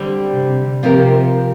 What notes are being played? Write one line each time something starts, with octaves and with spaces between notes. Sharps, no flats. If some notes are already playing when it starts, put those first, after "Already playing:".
Already playing: D3 G3 C4 G4
C3
C3 F3 C4 G4 A#4